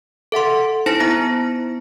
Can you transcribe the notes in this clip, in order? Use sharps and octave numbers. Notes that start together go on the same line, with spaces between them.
A4 E5 F#5 C6
D#4 E4 C5 A5 A#6
B3 E4 A#5